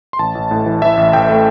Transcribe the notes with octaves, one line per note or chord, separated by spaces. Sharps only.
C6
A1 A5
A1
A2
E3
E3 E5
A1
A1 G5
A3